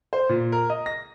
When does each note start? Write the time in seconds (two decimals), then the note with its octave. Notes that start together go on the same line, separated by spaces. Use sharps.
0.13 C5
0.29 A#2
0.52 A#4
0.70 D#5
0.86 A#6